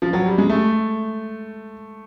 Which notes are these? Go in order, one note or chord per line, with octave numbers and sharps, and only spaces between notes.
F3
F#3
G3
G#3
A3